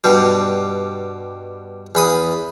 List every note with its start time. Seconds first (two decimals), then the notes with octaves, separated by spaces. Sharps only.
0.04 G2 B2 G3
1.95 E2 B5 D#6